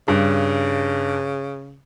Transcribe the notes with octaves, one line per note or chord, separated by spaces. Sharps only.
G2 C#3